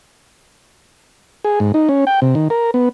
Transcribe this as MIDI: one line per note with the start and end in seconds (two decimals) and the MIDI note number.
1.45 1.59 68
1.60 1.72 44
1.74 1.88 63
1.89 2.05 61
2.07 2.20 79
2.22 2.35 48
2.35 2.48 51
2.50 2.71 70
2.74 2.89 59